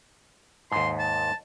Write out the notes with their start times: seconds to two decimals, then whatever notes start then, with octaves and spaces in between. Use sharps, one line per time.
0.72 D#2 G#2 C6
0.99 A5